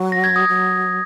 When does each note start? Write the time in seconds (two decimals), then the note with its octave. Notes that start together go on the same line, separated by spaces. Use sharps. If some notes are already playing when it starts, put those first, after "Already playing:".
Already playing: F#3
0.12 A#6
0.24 G#6
0.36 D#6
0.49 F#3